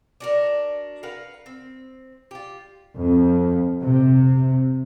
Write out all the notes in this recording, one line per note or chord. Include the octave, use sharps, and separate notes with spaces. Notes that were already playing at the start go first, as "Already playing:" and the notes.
D4 F#4 A#4
A#4 B4 F5 F#5
C4
F4 G4
F2
C3